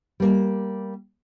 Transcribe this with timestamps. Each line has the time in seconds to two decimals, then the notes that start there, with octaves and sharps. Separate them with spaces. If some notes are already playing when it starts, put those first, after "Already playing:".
0.20 G3 A#3